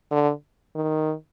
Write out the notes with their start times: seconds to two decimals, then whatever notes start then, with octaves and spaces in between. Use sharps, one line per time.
0.11 D3
0.75 D#3